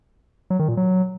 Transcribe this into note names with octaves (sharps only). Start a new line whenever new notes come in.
F#3
D#3
A#2
F#3